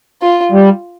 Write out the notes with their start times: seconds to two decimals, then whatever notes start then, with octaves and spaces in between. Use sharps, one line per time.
0.22 F4
0.52 G3